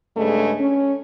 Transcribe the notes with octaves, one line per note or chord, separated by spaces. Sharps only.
G2 C#3 G#3 A3
C#4